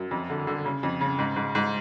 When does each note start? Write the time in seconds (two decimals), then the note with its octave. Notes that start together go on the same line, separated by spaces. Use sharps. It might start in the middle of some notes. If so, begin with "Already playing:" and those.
Already playing: F#2
0.11 F2
0.30 D3
0.47 D3
0.65 C#3
0.83 F2
1.01 C#3
1.19 G#2
1.36 G#2
1.55 G#2